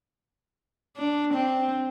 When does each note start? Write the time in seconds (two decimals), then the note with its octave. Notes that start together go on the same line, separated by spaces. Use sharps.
0.97 D4
1.33 C4